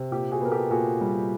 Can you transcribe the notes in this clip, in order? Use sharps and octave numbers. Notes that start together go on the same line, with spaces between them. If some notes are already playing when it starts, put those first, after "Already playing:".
Already playing: C3
A#2 G4
F#4 G#4
B3 A#4
G4 A4
A#2 F#4 G#4
G3